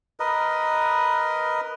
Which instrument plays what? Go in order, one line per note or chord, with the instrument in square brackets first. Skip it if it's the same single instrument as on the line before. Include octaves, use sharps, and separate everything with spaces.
[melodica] A#4 B4 D#5